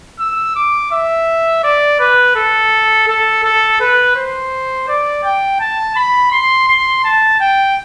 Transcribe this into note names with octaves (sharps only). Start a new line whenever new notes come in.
E6
D6
E5
D5
B4
A4
A4
A4
B4
C5
D5
G5
A5
B5
C6
C6
A5
G5